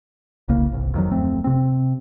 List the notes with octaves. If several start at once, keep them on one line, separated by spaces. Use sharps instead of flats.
E1 C2 C#3 A#3
G1 C2
F2 D#3 F#3
D1 F2 A3 C4
C3 C4